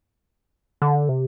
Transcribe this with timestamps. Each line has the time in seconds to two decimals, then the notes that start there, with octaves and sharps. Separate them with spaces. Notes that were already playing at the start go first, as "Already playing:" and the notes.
0.82 D3
1.09 C3